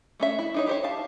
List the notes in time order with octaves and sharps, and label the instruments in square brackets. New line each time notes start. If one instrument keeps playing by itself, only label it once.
[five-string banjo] A3 C#4 E5
E4
D4 D#4 C#5
G4 C5 C#5
F5 A5